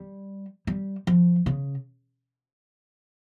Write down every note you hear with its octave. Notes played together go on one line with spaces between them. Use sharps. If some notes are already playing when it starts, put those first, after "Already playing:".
Already playing: G3
G3
F3
C#3